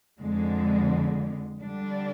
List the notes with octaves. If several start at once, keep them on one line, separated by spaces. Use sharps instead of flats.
F2 D3 G#3
D3 G3 D4